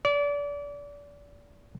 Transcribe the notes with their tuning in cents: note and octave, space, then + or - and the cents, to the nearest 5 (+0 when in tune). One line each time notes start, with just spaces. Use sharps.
D5 -30